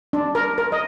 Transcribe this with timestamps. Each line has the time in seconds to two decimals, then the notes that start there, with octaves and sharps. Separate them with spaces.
0.13 D4
0.35 A#4
0.58 A#4
0.72 D#5